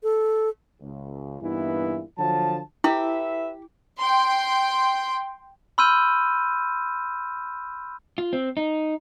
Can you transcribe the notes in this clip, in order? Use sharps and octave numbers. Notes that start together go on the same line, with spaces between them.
A4
C#2
G2 A#2 E3 B3 D#4 E4
D3 F3 F#3 A5
E4 G4 A4 B4 E5
G5 C6
B5 C6 E6 F6 G6 D#7
F4
C4
D#4